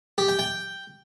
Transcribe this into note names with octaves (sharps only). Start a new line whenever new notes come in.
G4
G5
G5